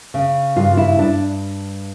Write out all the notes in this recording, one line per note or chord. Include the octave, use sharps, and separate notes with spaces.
C#3
G2 F4
E4
G2 D4